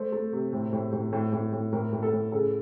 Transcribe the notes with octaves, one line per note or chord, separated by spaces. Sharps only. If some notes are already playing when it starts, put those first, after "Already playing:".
Already playing: A3 C5
A3
C3
A2
A2
A2
A2
A2
A2
A2 A#4
A2
A4
A2
C#3 A4